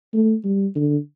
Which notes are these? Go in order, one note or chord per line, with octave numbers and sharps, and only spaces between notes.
A3
G3
D3